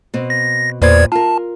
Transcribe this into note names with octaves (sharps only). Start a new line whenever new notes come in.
B2 C4
A#6
E2 A#2 B4 C5 D5 G#6
F4 A#4 A5